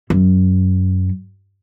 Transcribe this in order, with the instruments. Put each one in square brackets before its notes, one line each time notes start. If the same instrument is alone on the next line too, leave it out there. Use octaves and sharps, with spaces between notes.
[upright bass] F#2